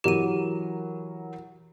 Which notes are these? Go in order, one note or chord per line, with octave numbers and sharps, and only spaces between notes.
E3 F#3 G4 A#4 D#7